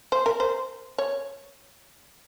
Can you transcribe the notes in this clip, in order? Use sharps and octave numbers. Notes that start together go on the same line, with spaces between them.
C5
A#4
C5
C#5